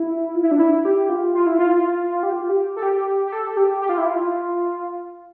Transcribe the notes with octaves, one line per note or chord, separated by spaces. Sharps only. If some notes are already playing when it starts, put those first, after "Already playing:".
Already playing: E4
F4
E4
D4
E4
G4
F4
F4
E4
F4
G4
F4
G4
A4
G4
G4
A4
G4
G4
F4
E4
F4